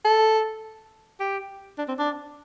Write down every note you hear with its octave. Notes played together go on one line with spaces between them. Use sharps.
A4
G4
D4
C4
D4